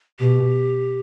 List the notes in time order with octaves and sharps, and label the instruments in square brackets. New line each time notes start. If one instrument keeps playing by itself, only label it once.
[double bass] B2 [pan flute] G4